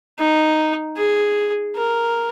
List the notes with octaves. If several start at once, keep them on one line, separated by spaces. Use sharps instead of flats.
D#4
G#4
A#4